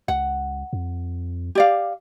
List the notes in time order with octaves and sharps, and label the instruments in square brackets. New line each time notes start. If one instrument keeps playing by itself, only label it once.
[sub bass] C#2 [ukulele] F#5
[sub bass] F2
[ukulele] G4 D5 F5